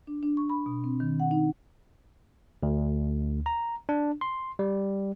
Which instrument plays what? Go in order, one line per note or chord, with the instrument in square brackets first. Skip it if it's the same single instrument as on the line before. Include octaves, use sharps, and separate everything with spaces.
[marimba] D4
D4
C#6
B5
B2
C4
D#3
F#5
D#4
[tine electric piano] D2
A#5
D4
C6
G3